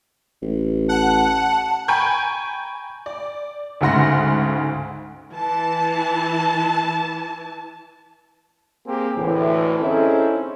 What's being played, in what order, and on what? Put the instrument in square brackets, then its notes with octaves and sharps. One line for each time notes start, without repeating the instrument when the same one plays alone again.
[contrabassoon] A1
[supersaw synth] F#5 [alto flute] A5
[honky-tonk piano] G5 G#5 A#5 B5 C#6 G6
D5
D2 G#2 C#3 F#5 C6 A#6
[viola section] E3 A5
[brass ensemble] A#3 C4 G4 G#4
D2 A2 E3
C4 C#4 D#4 E4 G#4 A4